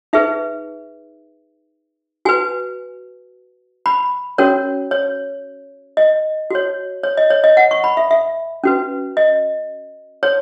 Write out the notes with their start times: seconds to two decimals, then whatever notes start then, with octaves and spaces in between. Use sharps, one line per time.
0.13 D#4 G#4 B4 E5
2.25 F#4 B4 G#5
3.86 B5
4.38 C#4 F#4 A#4 C#5
4.91 C#5
5.97 D#5
6.50 F#4 C#5
7.04 C#5
7.17 D#5
7.30 C#5
7.44 D#5
7.57 F#5
7.71 C#6
7.84 B5
7.97 E5
8.11 E5
8.64 C#4 F#4 B4
9.17 D#5
10.23 C#5